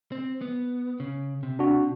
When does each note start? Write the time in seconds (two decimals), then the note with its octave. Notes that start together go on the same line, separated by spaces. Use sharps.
0.12 C4
0.41 B3
1.00 C#3
1.43 C3
1.59 D4 F#4